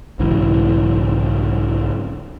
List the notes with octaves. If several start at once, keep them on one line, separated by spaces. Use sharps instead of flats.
B1 G#2 C#3 E3